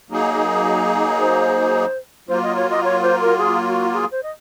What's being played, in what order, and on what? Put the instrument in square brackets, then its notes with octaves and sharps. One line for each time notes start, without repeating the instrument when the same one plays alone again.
[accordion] F#3 A#3 D#4 G#4
[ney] C5
[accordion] F#3 A#3 F4 [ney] C5
[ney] D#5
C#5
D#5
C#5
C5
A#4
G#4
F#4
G#4
C5
D#5